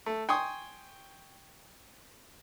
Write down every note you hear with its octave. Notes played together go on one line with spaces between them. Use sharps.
A3
G5 G#5 C6 C#6 D#6